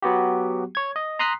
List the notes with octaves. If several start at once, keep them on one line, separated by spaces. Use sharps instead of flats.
F#3 B3 F#4 G4
C#5 G#6
D#5
A#5 C6 D#6 F#6 B6 C7